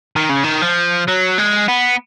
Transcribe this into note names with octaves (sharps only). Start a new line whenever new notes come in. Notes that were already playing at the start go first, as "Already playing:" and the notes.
D#3
C#3
D#3
F3
F#3
G#3
B3